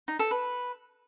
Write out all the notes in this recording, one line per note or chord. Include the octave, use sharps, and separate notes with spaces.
D#4
A4
B4